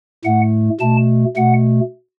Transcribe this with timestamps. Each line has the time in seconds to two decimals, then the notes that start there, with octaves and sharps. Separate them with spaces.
0.25 A2 A3 F#5
0.80 B2 A3 A5
1.36 B2 A3 F#5